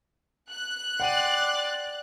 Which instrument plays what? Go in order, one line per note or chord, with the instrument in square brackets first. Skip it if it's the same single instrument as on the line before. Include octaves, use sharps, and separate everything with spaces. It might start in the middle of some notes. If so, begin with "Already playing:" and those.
[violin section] F#6
[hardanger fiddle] D5 C6 [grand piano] F#5 G5 D#7